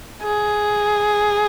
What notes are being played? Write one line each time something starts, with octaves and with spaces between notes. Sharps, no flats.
G#4